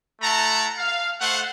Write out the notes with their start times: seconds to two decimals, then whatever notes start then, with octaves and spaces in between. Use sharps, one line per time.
0.21 A3 E4 F#5 A5 A#5
0.77 F5
1.20 A3 C5 F5 F#5